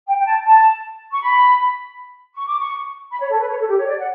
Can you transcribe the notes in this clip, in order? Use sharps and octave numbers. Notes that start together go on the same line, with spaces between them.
G5
G5
A5
A5
C#6
B5
C#6
D6
C#6
B5
C#5
A4
B4
C#5
A4
G4
C#5
D5
F#5